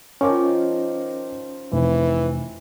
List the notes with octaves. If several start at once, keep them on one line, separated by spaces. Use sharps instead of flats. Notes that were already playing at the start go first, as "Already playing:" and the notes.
D#3 F3 C#4 A#4 D6
F1 E3